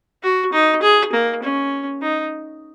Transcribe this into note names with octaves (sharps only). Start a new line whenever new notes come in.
F#4
D#4
G#4
A#3
C#4
D#4